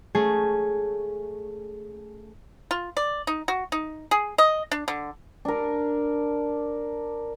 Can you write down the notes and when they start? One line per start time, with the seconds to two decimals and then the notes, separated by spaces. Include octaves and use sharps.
0.15 A3 C#4 G#4
2.71 F4
2.97 D5
3.27 D#4
3.48 F#4
3.72 D#4
4.11 G#4
4.38 D#5
4.71 D4
4.88 D3
5.45 D4 A#4